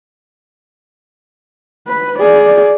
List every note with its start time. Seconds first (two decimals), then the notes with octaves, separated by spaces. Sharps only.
1.87 B4
2.18 G#4 D5